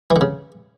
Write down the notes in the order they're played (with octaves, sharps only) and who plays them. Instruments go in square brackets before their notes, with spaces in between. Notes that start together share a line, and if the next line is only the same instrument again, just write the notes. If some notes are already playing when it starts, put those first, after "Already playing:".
[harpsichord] E3
D3
C#3